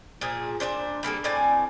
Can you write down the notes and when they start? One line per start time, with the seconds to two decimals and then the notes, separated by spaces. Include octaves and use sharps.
0.21 A#2 F3 G#4
0.60 A#2 D#3 D4 C5
1.03 G3 A#3 G#4 A4
1.24 A2 C4 D5 G#5